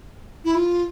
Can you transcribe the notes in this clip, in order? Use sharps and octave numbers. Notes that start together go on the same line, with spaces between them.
E4
F4